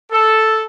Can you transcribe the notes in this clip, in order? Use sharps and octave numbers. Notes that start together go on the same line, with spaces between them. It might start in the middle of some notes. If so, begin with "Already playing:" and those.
A4